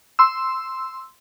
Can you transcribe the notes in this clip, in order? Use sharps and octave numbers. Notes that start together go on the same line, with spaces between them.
C6 E6